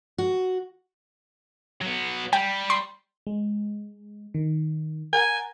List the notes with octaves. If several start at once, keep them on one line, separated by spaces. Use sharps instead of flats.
F#4
F#3 B3
G3 G5
C6
G#3
D#3
A#4 F#5 G#5 A#5